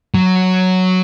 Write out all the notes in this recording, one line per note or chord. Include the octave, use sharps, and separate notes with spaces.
F#3